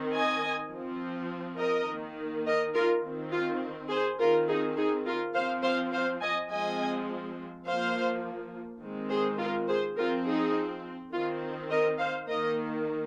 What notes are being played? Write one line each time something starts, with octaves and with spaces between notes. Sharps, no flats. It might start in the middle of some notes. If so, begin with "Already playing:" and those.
Already playing: D#3 C4
D#5 G#5
F3 C4
A#4 D#5
D#3 A#3
A#4 D#5
F4 A#4
D#3 C4
F4
G#4 C5
D#3 C4 F4 A#4
D#4 G#4
D#4 G#4
F4 A#4
F3 C4 C5 F5
C5 F5
C5 F5
D#5 G#5
F3 G#3 C4 D#5 G#5
F3 A#3 C5 F5
D#3 G#3 C4
G#4 C5
F4 A#4
G#4 C5
F3 C4 F4 A#4
D#4 G#4
D#3 C4 F4
A#4 D#5
C5 F5
D#3 A#3 A#4 D#5